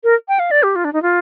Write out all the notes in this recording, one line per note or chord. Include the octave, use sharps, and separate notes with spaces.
A#4
G5
F5
D5
G4
F4
D4
D#4
F4